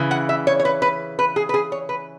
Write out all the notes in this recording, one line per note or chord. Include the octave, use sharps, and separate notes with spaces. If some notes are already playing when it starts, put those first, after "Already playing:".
Already playing: C#3 E3
F#5
E5
C#5
C#5
B4
B4
B4
G#4
B4
G#4
C#5
B4